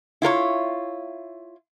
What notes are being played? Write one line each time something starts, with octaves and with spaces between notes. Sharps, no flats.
E4 F4 A#4 C#5